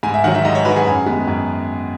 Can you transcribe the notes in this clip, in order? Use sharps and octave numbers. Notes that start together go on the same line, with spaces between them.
G#2 G#5
E5
D#3 F#3 F#5
E5
G#2 D#5
C#5
D#3 F#3 B4
G#4
F#2
D#3 G#3 B3
F#2